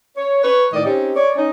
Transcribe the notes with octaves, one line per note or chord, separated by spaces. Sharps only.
C#5
B4 C#5
A2 D#3 D5 D#5
C4 C#4 D#4 G4
C#5 D5
C#4 D#4